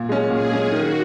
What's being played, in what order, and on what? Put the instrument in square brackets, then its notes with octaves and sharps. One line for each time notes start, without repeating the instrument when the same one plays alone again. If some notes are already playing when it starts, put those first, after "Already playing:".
Already playing: [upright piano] A#2
G#3 C#4
[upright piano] A#2 [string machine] G#4
[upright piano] G#3 C#4
[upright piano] D#3 [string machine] F#4